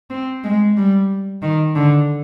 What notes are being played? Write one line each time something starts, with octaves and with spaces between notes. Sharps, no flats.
C4
G#3
G3
D#3
D3